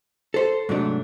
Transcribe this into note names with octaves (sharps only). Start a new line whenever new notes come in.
A4 C5
G#2 C3 F#3 A3 D4